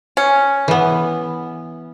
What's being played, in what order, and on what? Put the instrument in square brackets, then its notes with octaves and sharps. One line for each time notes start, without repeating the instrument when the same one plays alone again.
[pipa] C#4
[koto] E3 B3